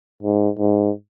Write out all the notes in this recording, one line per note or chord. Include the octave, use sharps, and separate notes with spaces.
G#2
G#2